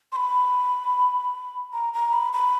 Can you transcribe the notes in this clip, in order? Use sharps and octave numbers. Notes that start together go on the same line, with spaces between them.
C6
B5
A#5
A#5
B5
B5